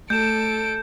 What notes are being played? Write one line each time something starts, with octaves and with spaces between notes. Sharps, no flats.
A3 A4 G6 D7 E7